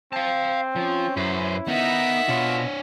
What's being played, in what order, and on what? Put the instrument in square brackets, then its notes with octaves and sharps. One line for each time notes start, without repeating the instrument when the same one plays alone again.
[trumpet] C4 [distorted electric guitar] F5 A5
[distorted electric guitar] F3 [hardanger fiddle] C#4
[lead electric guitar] F#2 [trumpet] E4 [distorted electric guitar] B4 C5
[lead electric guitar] B3 [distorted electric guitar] D#4 A#4 [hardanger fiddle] E5 F#5
[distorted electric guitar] B2 [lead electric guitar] D4 C#5 [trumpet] F4